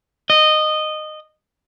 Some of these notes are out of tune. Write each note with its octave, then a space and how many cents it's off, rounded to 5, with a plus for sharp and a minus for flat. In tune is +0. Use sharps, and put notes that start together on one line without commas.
D#5 -15